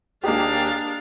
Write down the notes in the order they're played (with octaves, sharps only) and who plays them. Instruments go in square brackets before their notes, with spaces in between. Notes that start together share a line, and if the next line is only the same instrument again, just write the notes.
[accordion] D#2 G#4 [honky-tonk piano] A#3 D#4 G4 [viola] D4 F5